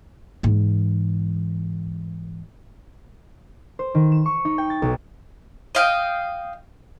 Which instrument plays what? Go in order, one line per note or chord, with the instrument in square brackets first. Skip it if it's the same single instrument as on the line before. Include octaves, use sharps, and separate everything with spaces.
[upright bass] G#2 E3
[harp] C5
D#3
E7
C#6
D#4
G5
A6
B1
[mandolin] D#5 F5 G5